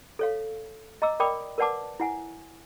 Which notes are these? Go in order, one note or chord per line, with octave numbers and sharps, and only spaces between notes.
A4 C#5 F5
D#5 A#5 D6 E6
A#4 D5 G5 B5 D6 D#6
A#4 B4 D5 F#5 A5 D6
E4 F#5 G#5